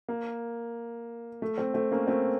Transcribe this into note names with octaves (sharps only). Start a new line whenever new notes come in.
A#3
A3
A3 C4
A3 C4
A#3 C#4
A3 C4